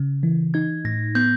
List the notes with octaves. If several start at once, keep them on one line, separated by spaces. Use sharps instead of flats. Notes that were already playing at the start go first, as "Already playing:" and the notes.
Already playing: C#3
E3
D#4 G#6
A2 A#6
B3 G6